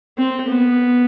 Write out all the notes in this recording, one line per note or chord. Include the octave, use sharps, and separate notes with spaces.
C4
B3